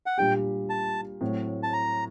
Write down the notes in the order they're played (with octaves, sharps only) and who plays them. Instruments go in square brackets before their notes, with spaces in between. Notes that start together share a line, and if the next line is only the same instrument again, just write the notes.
[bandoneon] F#5
[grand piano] A#2 G3 D4 G4 [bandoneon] G5
[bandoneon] A5
[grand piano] A2 F#3 C4
[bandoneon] A5
A#5